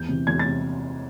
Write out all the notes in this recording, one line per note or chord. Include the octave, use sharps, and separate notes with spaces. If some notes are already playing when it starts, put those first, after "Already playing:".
Already playing: E2 G6
C3 E3
E2 G#6
A6
C3